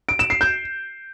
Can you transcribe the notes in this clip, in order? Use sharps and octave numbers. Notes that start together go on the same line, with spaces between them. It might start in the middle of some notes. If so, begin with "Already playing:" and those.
D7
E7
C7
G6